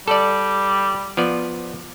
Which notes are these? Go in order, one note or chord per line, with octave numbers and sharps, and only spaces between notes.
G3 A4 D5
F3 B3 D5